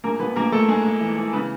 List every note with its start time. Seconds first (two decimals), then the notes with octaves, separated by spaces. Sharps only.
0.04 A#1 A#3 A#4
0.20 A#1 B3 B4
0.36 A#1 A#3 A#4
0.52 A#1 A3 A4
0.68 G#2 G#3 G#4
0.85 G#2
1.00 E3
1.17 E3
1.33 C#3 B3 B4